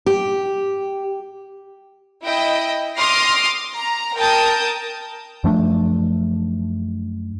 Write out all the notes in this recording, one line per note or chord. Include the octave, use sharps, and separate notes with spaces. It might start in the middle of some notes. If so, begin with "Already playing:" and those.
G4
E4 D#5 G5
C6 D6 D#6 F6 A#6 C7
A#5
A#4 G5 A5 D#6 G6
F#2 F3 A3 D4